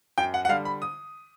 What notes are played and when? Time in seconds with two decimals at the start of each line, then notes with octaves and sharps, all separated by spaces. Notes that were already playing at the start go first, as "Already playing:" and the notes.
0.18 F#2 G5
0.34 F#5
0.45 F#5
0.49 D3 G3 F5
0.65 B5
0.82 D#6